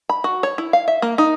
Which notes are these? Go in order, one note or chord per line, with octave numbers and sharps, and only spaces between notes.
B5
F#4
C#5
E4
F5
E5
A#3
D#4